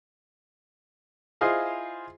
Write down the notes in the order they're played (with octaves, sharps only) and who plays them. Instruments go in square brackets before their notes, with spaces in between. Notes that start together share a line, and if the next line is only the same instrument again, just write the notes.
[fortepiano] E4 F4 G#4 C5 D#5 F5